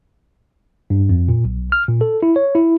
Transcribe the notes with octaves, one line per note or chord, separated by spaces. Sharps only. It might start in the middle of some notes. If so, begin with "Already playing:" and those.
G2
F2
A#2
B1
F6
A#2
A4
E4
C#5
E4